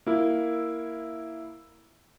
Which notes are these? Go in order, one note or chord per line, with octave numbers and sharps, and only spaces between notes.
A#3 E4